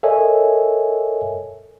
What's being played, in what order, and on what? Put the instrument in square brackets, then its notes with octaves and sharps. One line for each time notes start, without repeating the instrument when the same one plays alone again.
[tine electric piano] A4 A#4 C#5 D#5 E5 G#5